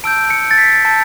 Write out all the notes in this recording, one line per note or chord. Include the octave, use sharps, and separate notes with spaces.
A5 E6 G6 D7
C#7
A6
B6
A5 E6 G6